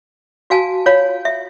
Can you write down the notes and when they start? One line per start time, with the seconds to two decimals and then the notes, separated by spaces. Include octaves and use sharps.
0.50 F#4 F5 G#5 A5
0.86 F4 C#5 F5
1.25 E5